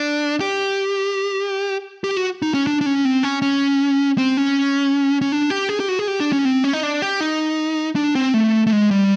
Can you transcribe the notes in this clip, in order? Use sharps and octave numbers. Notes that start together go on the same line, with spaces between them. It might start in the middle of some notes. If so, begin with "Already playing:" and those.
Already playing: D4
G4
G4
F#4
D#4
C#4
D4
D4
C#4
C4
C#4
C#4
C4
C#4
C#4
D4
G4
G#4
G4
F#4
G#4
G4
D4
C#4
C4
C#4
D#4
D4
G4
D#4
D4
C4
A3
A3
G#3
G3